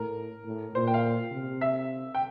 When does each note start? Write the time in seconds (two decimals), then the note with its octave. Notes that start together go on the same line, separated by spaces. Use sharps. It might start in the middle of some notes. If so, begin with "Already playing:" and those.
Already playing: A2 A#4
0.46 A2
0.74 A#2 C5
0.87 G5
0.94 F5
1.32 C3
1.61 E5
2.14 G5